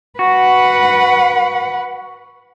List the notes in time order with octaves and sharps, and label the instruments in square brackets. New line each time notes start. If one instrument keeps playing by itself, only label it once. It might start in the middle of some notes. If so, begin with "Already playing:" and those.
[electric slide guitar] F#4 [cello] B4 F#5